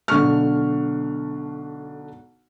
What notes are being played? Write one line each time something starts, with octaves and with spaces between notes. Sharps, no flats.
B1 D3 C#6 F6